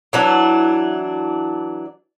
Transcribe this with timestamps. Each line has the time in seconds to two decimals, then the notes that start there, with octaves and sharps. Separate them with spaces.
0.13 E3 F#3 D4